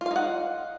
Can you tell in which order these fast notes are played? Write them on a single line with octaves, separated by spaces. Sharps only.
F4 F5 D#4 F#5